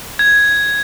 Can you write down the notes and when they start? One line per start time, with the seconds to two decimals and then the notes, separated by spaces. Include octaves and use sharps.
0.19 G#6